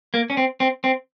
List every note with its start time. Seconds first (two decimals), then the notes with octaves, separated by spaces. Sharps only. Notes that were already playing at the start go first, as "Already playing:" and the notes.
0.14 A#3
0.30 C#4
0.37 C4
0.60 C4
0.84 C4